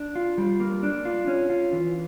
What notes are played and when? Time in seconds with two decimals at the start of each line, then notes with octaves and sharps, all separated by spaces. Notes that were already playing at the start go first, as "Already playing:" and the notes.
Already playing: D4
0.15 F4
0.38 G3
0.60 A#3
0.83 D4
1.05 F4
1.28 C#4
1.50 F4
1.73 E3